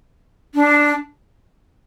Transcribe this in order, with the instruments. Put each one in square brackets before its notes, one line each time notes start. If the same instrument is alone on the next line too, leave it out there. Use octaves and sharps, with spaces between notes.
[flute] D4